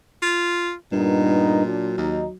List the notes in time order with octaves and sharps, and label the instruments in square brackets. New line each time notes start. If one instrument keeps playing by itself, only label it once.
[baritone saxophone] F4
[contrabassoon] G2 [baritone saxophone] A#2 [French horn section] D#3 B3 D#4
[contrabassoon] F#3 [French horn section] D4
[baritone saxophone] D#2 [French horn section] D#4